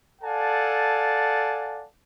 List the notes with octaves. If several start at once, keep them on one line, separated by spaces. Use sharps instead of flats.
A4 D5 F5 F#5 G#5 A5